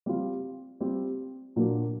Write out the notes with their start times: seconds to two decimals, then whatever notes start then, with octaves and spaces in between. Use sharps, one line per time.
0.06 G3 C4 F4
0.81 G3 C4 F4
1.56 A#2 F#3 A#3 D4